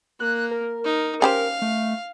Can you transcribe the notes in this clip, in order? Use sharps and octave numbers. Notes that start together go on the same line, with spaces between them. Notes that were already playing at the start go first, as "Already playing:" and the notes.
A#3 F#6
A#4
D#4
C#4 G4 C5 F5
A3